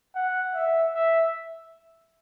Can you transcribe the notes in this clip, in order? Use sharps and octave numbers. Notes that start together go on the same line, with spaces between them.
F#5
E5
E5